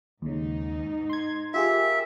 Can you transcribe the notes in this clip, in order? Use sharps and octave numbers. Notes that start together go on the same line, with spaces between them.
D#2 G#2 C#3 D#4
C6 G#6
F4 G4 G#4 A#4 E5